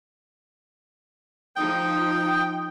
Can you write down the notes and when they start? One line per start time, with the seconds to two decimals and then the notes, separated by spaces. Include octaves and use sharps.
1.57 F3 D#4 G5 D#6